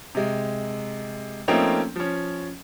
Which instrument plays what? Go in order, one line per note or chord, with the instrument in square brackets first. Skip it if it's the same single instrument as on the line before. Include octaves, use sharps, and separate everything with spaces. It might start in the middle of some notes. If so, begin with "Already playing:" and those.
[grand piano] C3 G#3
F3 A3 A#3 C4 C#4 D#4
F3 C#4